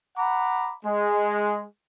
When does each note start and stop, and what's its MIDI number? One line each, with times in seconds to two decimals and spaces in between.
0.17 0.73 78
0.17 0.73 82
0.17 0.73 83
0.17 0.73 86
0.85 1.65 56